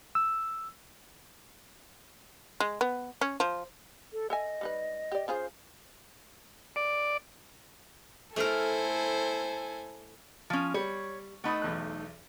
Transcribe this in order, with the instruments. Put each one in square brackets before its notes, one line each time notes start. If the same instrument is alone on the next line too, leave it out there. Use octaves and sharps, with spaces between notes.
[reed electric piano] E6
[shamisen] G#3
B3
C#4
F3
[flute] A4
[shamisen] A4 E5 G#5 [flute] D#5
[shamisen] G3 D#4 B4
G4 D5
[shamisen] C#3 F4 G#4 [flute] C5
[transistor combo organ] D5
[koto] A3 A#4 [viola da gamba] E4 C5 [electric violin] A4 G#5
[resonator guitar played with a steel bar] F3 C#4
[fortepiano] G3 [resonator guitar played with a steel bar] C#5
[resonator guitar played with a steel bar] A3 D#4 [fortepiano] F#5 B5 D#6
[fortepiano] B1 E2 F#6